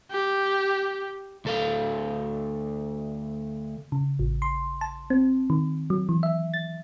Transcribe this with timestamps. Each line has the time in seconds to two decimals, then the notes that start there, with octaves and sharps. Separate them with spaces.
0.11 G4
1.45 D2 A4 F5
3.92 C#3
4.19 A1
4.42 C6
4.81 A5
5.10 C4
5.50 D#3
5.90 F#3
6.09 E3
6.23 E5
6.54 A6